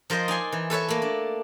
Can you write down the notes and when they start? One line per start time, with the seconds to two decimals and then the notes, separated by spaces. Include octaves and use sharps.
0.10 F3 A#4 C5 D#5
0.28 D#4 D5 G#5 C6
0.52 E3
0.70 A4 B4 C#5 E5
0.89 A3 A#3
1.02 D4